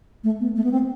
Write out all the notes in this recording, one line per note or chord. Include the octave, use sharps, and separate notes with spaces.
A3
B3
A3
B3
C4